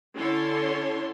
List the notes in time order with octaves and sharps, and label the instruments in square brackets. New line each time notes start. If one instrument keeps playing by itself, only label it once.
[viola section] D3 C#4 E4 A4 C#5 C6